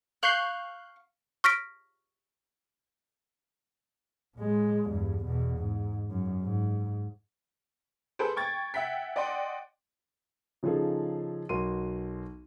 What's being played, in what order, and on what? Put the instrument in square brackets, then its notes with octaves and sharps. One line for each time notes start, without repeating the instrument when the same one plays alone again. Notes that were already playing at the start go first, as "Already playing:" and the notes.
[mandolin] F5 C#6 [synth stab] F#6 G6 C7
[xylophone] C#6 F6 A#6 B6 D7
[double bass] A2 G#3
E2 G2
E2 B2
G#2
F#2
G#2
[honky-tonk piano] G#4 A4 B4 C5
G5 C#6 G#6 A6
E5 F#5 G5 B6
D5 D#5 F#5 G5 C6
[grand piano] C#3 F3 D#4 F4 G#4 A4
B1 F#4 A#4 C6 D#7